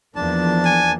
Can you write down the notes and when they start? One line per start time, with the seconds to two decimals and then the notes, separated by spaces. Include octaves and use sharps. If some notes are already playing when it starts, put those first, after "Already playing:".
0.16 E2 F3 A#3 D4 A5
0.65 G#5